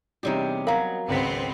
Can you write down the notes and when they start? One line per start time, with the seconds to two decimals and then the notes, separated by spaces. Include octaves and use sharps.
0.23 E2 C3 G3 C#4 D#4 G4
0.67 F#3 A#4 F5 A#5 B5
1.08 G#1 C#2 B3 C4 B6